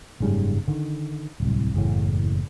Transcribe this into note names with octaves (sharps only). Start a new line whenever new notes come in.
F#1 G#2 C#3 G3
D3 D#3
D1 C2
F#1 E2 A2